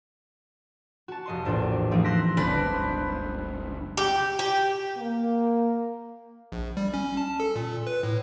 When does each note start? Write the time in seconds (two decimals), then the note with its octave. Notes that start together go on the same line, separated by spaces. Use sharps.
1.08 F#4 A5
1.26 F1 D#5 C6
1.45 A#1 E2 A2 D4 C5
1.91 E3 F3 A3 C4 D#4 G4
2.04 C6 E6 F#6 A#6 B6
2.37 F#1 C#2 G2 D4 B4 C5
3.97 G4
4.39 G4
4.98 A#3
6.52 A#1
6.77 G3
6.94 C#4
7.17 A5
7.40 A4
7.56 A#2
7.87 B4
8.03 A2